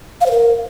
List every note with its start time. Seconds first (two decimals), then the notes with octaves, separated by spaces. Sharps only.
0.21 F5
0.26 C5
0.31 A#4